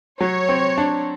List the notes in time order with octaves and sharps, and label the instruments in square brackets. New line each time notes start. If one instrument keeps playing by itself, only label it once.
[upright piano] F#3 [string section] C#5
[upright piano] C4
D4